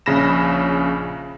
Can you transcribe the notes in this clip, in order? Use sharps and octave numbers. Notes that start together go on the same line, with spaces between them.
A#1 C#3 B5 A#6 E7